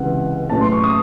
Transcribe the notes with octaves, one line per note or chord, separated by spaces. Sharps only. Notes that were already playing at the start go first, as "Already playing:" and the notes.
Already playing: C#2 C3 E3 F#5
A1 A2 F#3 C#4 A5
C6
C#6
D#6